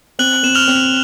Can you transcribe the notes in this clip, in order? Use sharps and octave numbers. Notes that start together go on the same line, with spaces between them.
C4 F#6 F#7
C4 E7
F6 F7
C4